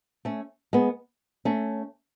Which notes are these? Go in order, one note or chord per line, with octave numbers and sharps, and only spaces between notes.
A3 C#4
G#3 B3
A3 C#4